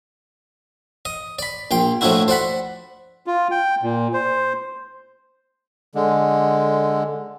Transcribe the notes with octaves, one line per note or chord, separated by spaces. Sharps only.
D#5
D5 B5
A#1 G5 C6
A2 F3 A3 D4 E4 F#4
C5 D5 F#5 B5
F4
G5
A#2
C5
D3 G#3